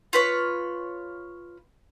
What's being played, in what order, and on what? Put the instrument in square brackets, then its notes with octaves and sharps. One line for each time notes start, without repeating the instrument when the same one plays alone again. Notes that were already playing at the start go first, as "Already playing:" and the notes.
[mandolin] F4 B4 C#5